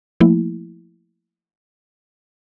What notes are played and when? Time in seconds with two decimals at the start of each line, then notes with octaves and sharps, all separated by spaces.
0.20 F3 A3 A#3 E4